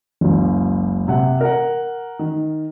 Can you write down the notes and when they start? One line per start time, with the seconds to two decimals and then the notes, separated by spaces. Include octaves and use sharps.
0.21 F#1 C#2
1.08 C3 F#5
1.41 A#4 F#5
2.19 D#3